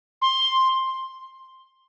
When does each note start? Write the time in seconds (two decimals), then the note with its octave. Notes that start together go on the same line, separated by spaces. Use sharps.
0.22 C6